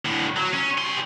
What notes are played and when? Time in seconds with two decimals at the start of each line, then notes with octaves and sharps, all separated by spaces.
0.05 A2 D3
0.37 F#3
0.54 C#4
0.78 G3 C6